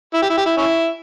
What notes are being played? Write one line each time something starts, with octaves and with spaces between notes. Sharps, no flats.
E4
G4
E4
G4
E4
C#4 E4